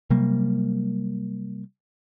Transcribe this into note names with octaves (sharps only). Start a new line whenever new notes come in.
C3 F#3 G3 A#3